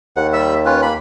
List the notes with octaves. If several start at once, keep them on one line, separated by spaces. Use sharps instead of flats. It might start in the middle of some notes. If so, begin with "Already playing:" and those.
D#2 F#5
G3 E5 E6
C#4 F4 B4
A#3 B5